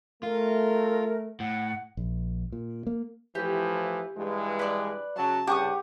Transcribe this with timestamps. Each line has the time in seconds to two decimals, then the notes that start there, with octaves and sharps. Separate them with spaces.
0.23 A3 F4 A#4
1.40 A2 F#5
1.97 A#1
2.52 A#2
2.87 A#3
3.35 A2 E3 F3 G4
4.16 G2 E3 G#3
4.59 B4 D5
5.16 C#3 F#3 A5
5.47 C2 G2 C#3 G4 F#5 C#6 D#6